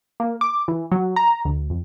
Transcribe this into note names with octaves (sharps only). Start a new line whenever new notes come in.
A#3
D6
E3
F#3
A#5
D2
F2